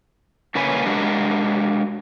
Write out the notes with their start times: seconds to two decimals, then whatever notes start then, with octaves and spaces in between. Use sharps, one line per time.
0.55 A2 C#3 A#3 C#4 B4 G#5
0.86 G#3 D4 F#4 G4 A#4